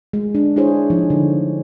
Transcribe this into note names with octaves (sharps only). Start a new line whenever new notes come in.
G#3
D4
D4 E4 G#4 C5 C#5
F3 D#4
D3